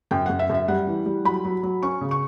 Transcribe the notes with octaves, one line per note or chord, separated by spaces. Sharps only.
F#2 G5
F#2 F#5
E5
F#2 E5
G3 F#5
E3
G3
F#3 B5
F#3
F#3
C#4 C#6
C#3
C#6